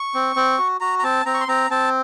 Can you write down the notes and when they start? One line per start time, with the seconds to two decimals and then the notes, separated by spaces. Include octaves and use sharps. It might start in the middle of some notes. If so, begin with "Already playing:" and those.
Already playing: C#6
0.15 C4
0.36 C4
0.58 F#4
0.80 F#4 A#5
0.99 A#5
1.03 C4 A5
1.26 C4 A#5
1.34 C#6
1.41 C6
1.48 C4 A#5
1.71 C4 A5